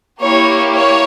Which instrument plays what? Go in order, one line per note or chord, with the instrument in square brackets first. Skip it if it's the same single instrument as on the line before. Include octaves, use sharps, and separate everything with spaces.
[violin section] A#3 E4 G4 C#5
C#5